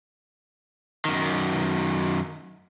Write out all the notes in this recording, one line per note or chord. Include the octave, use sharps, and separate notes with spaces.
F#2 D#3